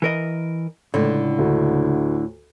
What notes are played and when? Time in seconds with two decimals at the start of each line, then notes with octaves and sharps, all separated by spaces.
0.02 E3 A#4 D#5
0.94 C#2 A2 D3
1.39 D2